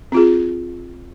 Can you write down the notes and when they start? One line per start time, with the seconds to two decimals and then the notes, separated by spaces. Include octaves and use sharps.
0.12 C4 F4 G#4